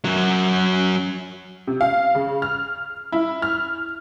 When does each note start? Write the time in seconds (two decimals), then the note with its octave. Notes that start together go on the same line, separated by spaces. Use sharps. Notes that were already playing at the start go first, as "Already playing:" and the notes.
0.05 F#2 F#3
1.67 C3
1.81 F5
2.15 C#3
2.42 F6
3.12 E4
3.42 F6